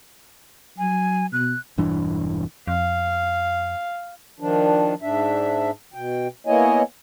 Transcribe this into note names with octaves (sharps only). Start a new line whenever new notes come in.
F#3 G#5
B2 F#6
E1 G2 E3 D4
F2 F5
D#3 F3 D4
G#2 D4 E5
B2 G5
A#3 B3 E4 C#5 D#5 G#5